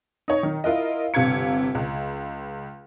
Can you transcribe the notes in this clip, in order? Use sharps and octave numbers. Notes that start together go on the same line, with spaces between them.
D#4 C#5
D#3
E4 F4 A#4 D#5
G1 C3 F5 G#6 C#7
C#2